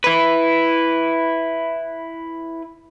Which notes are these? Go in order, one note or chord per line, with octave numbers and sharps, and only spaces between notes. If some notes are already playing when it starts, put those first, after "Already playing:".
E4 B4